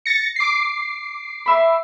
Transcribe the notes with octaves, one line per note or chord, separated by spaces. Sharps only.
A6 A#6 C#7
D6 C7
E5 B5